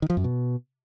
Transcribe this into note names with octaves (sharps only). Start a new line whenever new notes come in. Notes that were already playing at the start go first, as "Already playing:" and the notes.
D#3
F3
F#2
B2